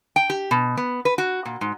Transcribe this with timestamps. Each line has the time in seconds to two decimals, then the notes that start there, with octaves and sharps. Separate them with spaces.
0.16 G5
0.30 G4
0.51 B2
0.77 B3
1.05 B4
1.18 F#4
1.45 A#2
1.61 G#2